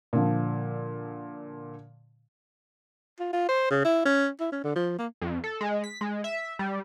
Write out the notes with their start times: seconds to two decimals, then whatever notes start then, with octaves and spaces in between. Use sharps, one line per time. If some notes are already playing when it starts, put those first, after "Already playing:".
0.13 A#2 D3 F3
3.20 F4
3.33 F4
3.49 C5
3.70 C#3
3.84 E4
4.05 C#4
4.40 E4
4.52 C#4
4.64 D3
4.76 F3
4.98 A#3
5.22 F2
5.44 A4
5.61 G#3
5.84 B6
6.01 G#3
6.24 E5
6.59 G3